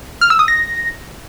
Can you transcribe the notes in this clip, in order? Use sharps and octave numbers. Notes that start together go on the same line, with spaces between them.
F6
E6
D#6
A#6